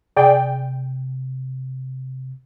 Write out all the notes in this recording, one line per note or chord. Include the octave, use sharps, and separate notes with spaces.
C3 G#4 D5 G5